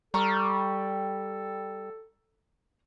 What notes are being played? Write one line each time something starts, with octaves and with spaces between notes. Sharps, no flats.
G3 A4 A#5 C#6 F6